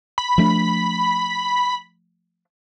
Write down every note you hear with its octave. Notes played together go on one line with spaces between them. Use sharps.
B5
F3 A3 D4